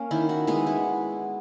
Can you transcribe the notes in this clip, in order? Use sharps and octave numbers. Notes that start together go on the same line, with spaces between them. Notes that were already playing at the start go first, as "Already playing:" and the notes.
Already playing: A#3 C#4 A#4
D#3 E4
F#4
G#3 B3 G#4
E4